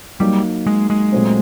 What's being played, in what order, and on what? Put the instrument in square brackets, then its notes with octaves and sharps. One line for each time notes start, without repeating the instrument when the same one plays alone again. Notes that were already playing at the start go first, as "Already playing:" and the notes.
[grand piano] F#3 A#3 D#4 [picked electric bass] G3
[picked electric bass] G#3
G#3
[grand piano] A#2 F#3 A3 C4